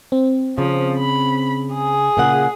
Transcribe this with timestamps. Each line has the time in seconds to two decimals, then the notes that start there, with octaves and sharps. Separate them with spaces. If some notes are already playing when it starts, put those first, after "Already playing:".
0.12 C4
0.58 C#3 F3
0.98 B5
1.72 G#4
2.17 A#2 C#3 F#5